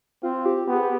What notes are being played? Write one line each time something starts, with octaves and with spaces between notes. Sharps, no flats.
C4 F4
G4
B3 G4
G#4
G4